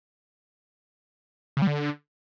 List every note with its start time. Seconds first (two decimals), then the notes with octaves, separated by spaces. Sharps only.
1.57 C#3
1.62 G3
1.67 D3